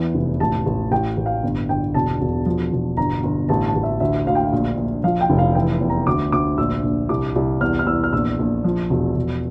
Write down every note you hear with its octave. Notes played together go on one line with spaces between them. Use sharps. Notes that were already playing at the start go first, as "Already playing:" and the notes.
Already playing: E2 E3
F1
A1 A5
A1
A1 G5
A1
F5
G1
G1 G5
E1 A5
E1
F3
E1
G1 A#5
G1
A1 A5
A5
A1
E5
D2 E5
D2 F5
G5
F5
A#1
A#1
F3 F5
G5
F1
F5
E3 G5
E2
A#5
D2 D6
D2 D6
A#1 E6
A#1
C2 D6
C2
E2 F6
F6
E2 E6
F6
A#1 E6
A#1
F3
E1
E1